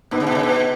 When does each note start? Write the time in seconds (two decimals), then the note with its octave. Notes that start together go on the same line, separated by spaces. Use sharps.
0.11 B2 B3 D#4
0.20 C#3
0.27 B2
0.35 C#3
0.43 B2